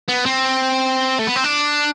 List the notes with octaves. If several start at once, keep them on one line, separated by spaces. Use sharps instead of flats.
B3
C4
A3
B3
C4
D4